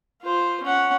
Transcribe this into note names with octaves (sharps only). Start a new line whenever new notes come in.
F4 C5
C#4 F#5